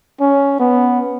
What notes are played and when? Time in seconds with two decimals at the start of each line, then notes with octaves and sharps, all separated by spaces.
0.21 C#4
0.60 B3